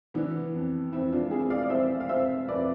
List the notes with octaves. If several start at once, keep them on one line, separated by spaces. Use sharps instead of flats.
E3 B3 D4
F2
F2 C4 E4
D4 F4
F2 E4 G#4
D5 F5
D5
F2 C5 E5
F5
F2 C5 E5
F2 B4 D5